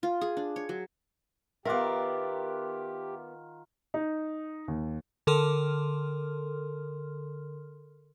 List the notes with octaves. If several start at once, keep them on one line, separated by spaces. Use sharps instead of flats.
F4
G#4
D4
C#5
F#3
D#3 B3 F4 G4 A#4 E5 F#5 D6
D#4
D#2
D3 A4 A#4 C6 F6